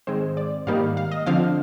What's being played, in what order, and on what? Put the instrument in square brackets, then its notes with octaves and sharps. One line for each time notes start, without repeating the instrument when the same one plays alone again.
[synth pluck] G#2 D#3 G#3 C4 C5
D5
G#2 D#3 G3 A#3 F5
F5
D#5
D3 F3 C4 F5